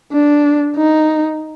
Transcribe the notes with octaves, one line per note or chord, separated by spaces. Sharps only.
D4
D#4